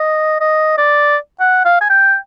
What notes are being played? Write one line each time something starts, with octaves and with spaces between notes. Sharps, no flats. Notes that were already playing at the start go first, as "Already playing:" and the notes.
Already playing: D#5
D#5
D5
F#5
F5
G#5
G5